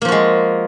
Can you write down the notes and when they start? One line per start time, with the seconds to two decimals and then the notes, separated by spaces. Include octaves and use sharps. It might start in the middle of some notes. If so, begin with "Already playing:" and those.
0.02 A#3
0.05 F3
0.08 F#4
0.12 G#3